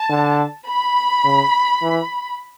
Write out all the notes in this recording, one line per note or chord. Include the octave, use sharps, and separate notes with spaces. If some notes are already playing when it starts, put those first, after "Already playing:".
Already playing: A5
D3
B5
C#3
E3